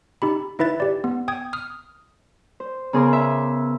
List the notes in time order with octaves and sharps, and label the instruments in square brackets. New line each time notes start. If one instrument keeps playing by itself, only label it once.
[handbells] D#4 G4 B5
D#4 E4 B4 E5 A6
G4 D5
B3
G5 D#6 G#6
D#6 F6
[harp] C5
C#3 B3 G#4 A#4 C6 D6
E5